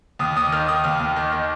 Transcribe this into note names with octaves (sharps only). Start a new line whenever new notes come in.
D#2 D#6
D#2 D#6
D#3 F6
D#3 D#6
D#2 F6
D#2
D#3
D#3